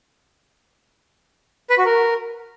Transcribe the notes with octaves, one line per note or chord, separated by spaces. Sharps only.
B4
F#4
A#4